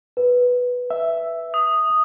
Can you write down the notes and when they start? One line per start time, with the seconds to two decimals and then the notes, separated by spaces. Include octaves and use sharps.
0.17 B4
0.90 E5
1.54 D#6